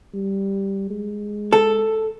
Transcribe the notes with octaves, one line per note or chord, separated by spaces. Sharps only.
G3
G#3
A4